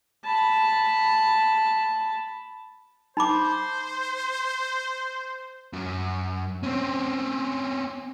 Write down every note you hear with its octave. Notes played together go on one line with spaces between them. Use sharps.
A5 B5
D#4 C5 B5 D6
F#2
C4 C#4